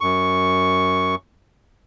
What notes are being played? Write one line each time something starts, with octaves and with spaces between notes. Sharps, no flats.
F#2 C#6